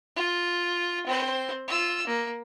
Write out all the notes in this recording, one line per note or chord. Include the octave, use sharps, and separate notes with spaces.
F4
C4 C5
F4 E6
A#3